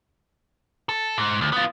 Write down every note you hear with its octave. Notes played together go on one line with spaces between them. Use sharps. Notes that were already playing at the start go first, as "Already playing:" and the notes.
A4
G#2
D2
B3 F4